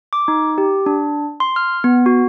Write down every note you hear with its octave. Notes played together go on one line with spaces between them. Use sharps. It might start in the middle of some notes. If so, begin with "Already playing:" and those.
D6
D#4
G4
D4
C6
F6
B3
F#4